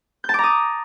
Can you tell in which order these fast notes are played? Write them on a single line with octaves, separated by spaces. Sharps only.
G6 A5 D6 A#5 D#6